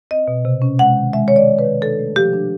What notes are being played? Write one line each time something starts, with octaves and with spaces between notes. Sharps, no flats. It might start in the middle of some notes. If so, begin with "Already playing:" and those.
C4 D#5
B2
C3
C#4
G#3 F#5
D#3
G#3 E5
D#3 C#5
D5
C3
B4
D#3
D4 A4
A3
F3 G4
D4